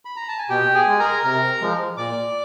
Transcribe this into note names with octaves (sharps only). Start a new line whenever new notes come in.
B5
A#5
A5
G#5
B2 G4 G5
G#4 G#5
G#3
A#4 A#5
C3 A#4 A#5
F3 G#3
A#2 D5 D6